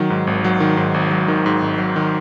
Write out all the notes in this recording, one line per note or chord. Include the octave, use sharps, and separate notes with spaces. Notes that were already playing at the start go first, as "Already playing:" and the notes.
Already playing: D#3 F#3
G#2
G#1
F#3
D#3
G#2
G#1
F#3
D#3
G#2
G#1
F#3
D#3